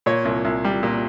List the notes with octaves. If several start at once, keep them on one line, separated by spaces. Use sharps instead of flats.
A#2 C#5
C2
C2
G3
A#2